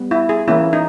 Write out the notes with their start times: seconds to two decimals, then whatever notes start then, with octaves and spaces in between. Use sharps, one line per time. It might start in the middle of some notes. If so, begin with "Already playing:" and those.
Already playing: G3 B3
0.11 E4
0.29 G#4
0.48 E3 A#3 C#4 E4
0.73 D#4